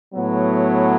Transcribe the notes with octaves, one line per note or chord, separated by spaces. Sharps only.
A2 F#3 B3